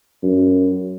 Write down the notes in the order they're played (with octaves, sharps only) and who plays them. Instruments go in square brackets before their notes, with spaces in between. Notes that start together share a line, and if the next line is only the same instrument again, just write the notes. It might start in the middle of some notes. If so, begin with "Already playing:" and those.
[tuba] F#2